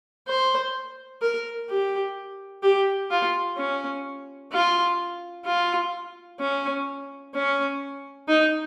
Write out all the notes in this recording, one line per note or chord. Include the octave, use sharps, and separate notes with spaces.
C5
A#4
G4
G4
F4
C#4
F4
F4
C#4
C#4
D#4